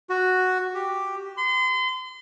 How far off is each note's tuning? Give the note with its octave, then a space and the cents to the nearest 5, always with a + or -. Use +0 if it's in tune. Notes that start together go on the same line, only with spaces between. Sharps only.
F#4 +0
G4 +0
C6 -35